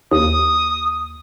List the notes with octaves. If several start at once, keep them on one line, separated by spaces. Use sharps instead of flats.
D#2 D#6